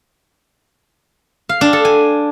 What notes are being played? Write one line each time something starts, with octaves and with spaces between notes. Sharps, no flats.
F5
D4
A4
G#5